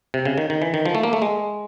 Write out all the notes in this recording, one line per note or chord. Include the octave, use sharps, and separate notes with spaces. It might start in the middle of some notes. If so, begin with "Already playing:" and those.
C3
C#3
D#3
D#3
E3
D#3
F3
A3
A#3
A3
G#3